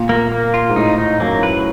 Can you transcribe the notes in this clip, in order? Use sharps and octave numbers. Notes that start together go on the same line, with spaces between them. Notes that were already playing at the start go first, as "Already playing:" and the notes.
Already playing: A#2
A#3
A#3
F4
G#2
A2 D#4
D#4
F#2 A#3
B4